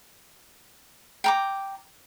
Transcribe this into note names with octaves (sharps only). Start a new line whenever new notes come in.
G5 A#5 D6